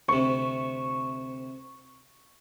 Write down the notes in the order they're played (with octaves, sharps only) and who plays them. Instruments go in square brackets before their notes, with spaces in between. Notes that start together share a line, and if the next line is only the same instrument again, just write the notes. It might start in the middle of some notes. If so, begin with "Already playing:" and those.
[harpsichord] D2 C3 [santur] C#6